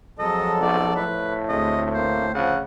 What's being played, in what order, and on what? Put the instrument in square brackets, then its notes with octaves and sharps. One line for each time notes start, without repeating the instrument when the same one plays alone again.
[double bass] F2 F3 [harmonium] F#3 G#3 A4 [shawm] D#5
[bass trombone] B1 [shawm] D5
[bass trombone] A2 [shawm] B4
[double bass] D2 C4 [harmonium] G#3 [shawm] D#5
[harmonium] A#3 [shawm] C5
[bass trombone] C#3 [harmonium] F3 [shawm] F#5